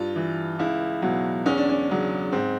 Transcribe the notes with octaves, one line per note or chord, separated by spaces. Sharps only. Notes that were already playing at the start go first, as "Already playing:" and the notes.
Already playing: G2 F4
E3
C#2 E4
B2 F#3
E2 C#4
D4
C#4
C#3 F#3
G#2 C4